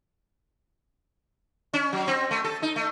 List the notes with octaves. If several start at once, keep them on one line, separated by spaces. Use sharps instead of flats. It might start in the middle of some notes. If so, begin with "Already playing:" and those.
C#4
F#3
C4
A3
A4
D#4
A3